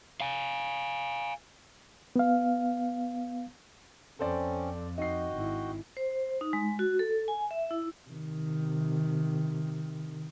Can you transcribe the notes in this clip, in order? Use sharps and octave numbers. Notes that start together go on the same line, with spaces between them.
F5 G#5
B3 F5
F2 C4 C#4 A4 C5 D5
D#4 F#4 D#5 G5 C7
G#1 E4
C5
D#4
G#3
F#4
A4
G#5
E5
E4
C3 D#3